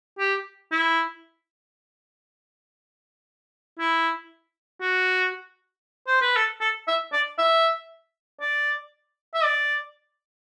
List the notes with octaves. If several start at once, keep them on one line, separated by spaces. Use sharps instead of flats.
G4
E4
E4
F#4
C5
B4
A4
A4
E5
D5
E5
D5
E5
D5